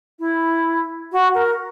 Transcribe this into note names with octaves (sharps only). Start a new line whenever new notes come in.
E4
F#4
A#4